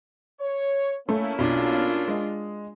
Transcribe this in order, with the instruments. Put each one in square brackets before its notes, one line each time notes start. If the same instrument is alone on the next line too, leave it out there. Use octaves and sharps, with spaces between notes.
[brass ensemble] C#5
[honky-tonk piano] A3 [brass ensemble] A#3 C#4 E4
[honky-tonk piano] B1 [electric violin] D4 F4
[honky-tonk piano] G#3